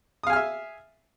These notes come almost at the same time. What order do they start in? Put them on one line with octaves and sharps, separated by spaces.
D#6 F5 G#5 F6 E5